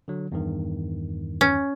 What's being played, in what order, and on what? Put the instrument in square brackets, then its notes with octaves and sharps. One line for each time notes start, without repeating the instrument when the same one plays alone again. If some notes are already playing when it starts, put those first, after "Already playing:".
[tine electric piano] D3 F#3
E2 G2 D#3
[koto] C#4